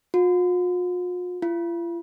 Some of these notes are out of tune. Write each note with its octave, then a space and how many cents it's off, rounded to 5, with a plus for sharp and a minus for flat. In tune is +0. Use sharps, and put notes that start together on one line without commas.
F4 +45
F4 -45